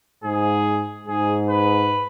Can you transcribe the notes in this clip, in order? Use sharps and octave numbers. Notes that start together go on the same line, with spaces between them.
G#2 G#4
G#2 G#4
B4